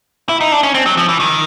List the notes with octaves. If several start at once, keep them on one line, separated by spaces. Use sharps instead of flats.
E4
D#4
D4
C#4
C4
F#3
F3
E3
D#3